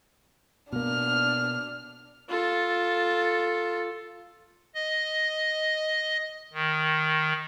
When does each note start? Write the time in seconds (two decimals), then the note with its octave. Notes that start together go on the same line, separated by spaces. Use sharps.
0.73 B2 A#3 D4 F6
2.29 F4 A4
4.75 D#5
6.53 D#3